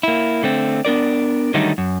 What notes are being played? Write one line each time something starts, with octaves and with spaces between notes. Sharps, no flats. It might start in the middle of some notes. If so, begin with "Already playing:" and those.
A#3 E4
D3 A3 C4
B3 D4 A#4 D5
D3 D#3 F#3 G3 A3 D#4
F#2